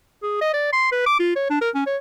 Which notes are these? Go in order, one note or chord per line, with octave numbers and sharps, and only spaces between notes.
G#4
D#5
D5
C6
B4
D6
F4
C#5
D4
A#4
C#4
C#5